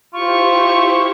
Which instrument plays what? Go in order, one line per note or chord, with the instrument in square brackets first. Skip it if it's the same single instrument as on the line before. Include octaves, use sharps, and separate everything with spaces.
[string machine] E4 G4 C5 [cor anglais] F4 [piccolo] C#6